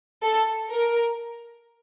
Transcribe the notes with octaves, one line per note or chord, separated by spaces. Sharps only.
A4
A#4